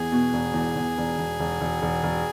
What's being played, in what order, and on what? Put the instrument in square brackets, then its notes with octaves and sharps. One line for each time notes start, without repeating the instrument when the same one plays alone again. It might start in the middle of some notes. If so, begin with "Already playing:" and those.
Already playing: [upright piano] E2 [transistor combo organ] G#4
[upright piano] B2
E1
E2
E2
E1
E1
E1
E1
E1
E1